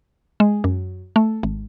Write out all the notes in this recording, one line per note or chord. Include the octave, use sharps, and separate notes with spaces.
G#3
F#2
A3
G#1